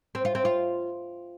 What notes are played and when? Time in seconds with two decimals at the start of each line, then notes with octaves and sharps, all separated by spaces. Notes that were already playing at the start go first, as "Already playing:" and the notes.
0.15 C4
0.25 F4
0.35 C4
0.45 F4